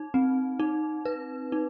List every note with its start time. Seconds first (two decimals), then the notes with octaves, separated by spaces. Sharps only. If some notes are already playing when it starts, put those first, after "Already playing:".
Already playing: D#4
0.14 C4
0.60 D#4
1.05 B4
1.52 D#4